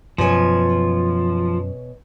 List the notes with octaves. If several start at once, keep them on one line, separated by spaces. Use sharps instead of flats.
F#2 B2 F3 C#5 G#5